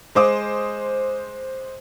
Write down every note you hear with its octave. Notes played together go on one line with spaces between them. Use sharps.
G#3 C5 D6 D#6